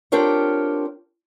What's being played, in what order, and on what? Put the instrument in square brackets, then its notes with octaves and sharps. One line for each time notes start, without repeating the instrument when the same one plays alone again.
[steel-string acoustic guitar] C4 D4 F4 G4 A#4 C#5